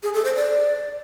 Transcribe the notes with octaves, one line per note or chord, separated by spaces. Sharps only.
G#4
A4
C5
D5